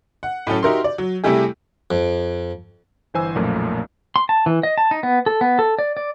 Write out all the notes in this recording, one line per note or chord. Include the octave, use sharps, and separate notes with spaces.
F#5
A2 F#3 C#4 A4
D#4 F#4 G4 A#4 E5 C6
D5
F#3
C3 G3 A3 E4 G4 G#4
F2
G1 E3 C5 G#5 E6
B1 F#2 A#2 F3 A3 A#3
C6
A5
E3
D#5
A5
D#4
B3
A4
B3
A4
D5
D5